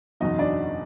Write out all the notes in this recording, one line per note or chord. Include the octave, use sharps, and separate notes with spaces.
F#1 E2 B2 F#3 D#4 D#5
D4 D5